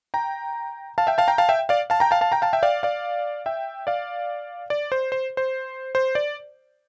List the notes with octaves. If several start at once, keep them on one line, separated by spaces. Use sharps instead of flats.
G5 A#5
F5 A5
E5 G5
F5 A5
G5 A#5
F5 A5
E5 G5
D5 F5
F5 A5
G5 A#5
F5 A5
F5 A5
G5 A#5
F5 A5
E5 G5
D5 F5
D5 F5
E5 G5
D5 F5
D5
C5
C5
C5
C5
D5